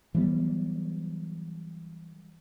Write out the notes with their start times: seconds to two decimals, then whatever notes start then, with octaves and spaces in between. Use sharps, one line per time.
0.15 E3 F#3 G3 B3